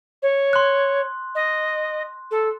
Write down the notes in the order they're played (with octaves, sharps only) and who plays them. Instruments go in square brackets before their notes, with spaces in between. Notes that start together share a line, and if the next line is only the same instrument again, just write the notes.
[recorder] C#5
[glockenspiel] C6 F#6
[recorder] D#5
A4